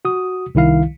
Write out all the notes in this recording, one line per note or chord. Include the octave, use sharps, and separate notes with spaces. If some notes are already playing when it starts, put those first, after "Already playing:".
F#4 D#6
C2 D#3 E4 F5